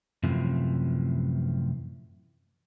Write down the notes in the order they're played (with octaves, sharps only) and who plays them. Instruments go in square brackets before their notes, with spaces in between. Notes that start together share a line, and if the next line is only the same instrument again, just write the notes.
[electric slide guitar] F#2 A2 C3 E3 F3